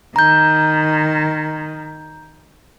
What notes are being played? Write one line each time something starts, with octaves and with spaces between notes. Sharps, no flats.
D#3 A#5 G6